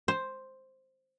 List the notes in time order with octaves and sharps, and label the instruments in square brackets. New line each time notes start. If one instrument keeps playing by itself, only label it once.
[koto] C5